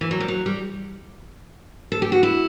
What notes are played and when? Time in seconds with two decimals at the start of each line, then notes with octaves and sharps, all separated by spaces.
0.01 E3
0.11 F#3
0.20 G3
0.28 F#3
0.46 G3
1.92 A4
2.02 G4
2.12 F#4
2.23 E4